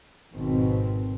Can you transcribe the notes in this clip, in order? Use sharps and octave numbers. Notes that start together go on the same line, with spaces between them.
G#1 B2 D#3 C4